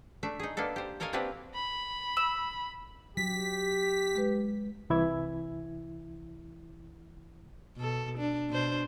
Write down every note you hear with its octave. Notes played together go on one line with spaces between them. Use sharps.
A3 D4 E5
D#4 G#4
A#3 B3 D4 A4
G4 C5
A4 A#4 C#5 D#5 F5 G#5
A#3 C4 D4 F#4 G4 B4
B5
E6
F#3 G4 B6
G#3 B4
C2 E3 E4 G#6
B2 A4
D4
B2 D4 C5